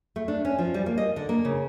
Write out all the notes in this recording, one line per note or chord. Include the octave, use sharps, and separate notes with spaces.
A3
D4
C#4
F3
G3
A#3
D#5
D3
A#3
C#3